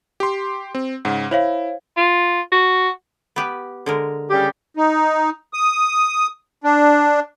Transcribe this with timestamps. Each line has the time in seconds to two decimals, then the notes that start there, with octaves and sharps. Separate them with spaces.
0.20 G4 C6
0.75 C4
1.05 G#2 C#3 F#5
1.31 E4 C5 C#5 F5
1.97 F4
2.52 F#4
3.36 B3 G4 B4
3.86 D3 G#3 A#4
4.31 C#3 G3 G4
4.77 D#4
5.53 D#6
6.64 D4